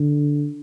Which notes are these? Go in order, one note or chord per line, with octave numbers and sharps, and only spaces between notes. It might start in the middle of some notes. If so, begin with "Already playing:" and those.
Already playing: D3